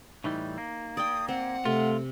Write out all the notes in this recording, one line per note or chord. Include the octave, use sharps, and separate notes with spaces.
A2 E3 G3 D#4
A#3
D5 G5 D#6
C4 F#5
C3 A3 F4